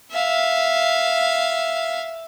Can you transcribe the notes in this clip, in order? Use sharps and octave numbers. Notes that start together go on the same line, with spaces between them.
E5 F5